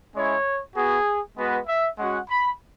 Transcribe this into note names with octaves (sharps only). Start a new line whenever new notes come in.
G#3 C#4 E4 C#5
B3 F#4 G#4
G#3 B3 F#4 B4
E5
G#3 C#4 F#4 F#5
B5